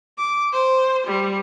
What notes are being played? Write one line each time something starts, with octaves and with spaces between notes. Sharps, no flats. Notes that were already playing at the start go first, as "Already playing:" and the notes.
D6
C5
G3